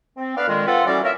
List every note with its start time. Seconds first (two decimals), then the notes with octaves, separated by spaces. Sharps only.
0.17 C4
0.36 B3 D4 B4 F5
0.47 A#2 D3 D#3 G#3
0.67 C4 F4 A4 B4 F5 F#5
0.86 E3 F#3 G3 C#4 A4 D5
1.03 F#3 A#3 A#4 C#5 E5